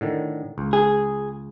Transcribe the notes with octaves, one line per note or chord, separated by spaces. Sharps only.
A2 D3 D#3
C#2
G#4